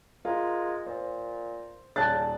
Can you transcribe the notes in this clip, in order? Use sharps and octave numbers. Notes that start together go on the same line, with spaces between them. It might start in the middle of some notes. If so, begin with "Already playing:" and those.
G#3 F4 A#4
A#2 C5
D#1 C#3 A5 F#6 A6